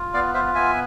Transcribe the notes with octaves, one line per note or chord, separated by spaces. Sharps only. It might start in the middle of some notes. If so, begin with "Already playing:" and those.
Already playing: F4
B3 D5 F5
F4 C5 E5
B3 E5 G#5